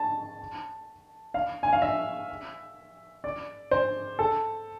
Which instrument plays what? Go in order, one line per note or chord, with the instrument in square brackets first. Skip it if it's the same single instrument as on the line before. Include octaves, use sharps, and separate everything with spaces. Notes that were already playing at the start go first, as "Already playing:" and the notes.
Already playing: [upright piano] A5
F5
G#5
F5
E5
D5
C5
A4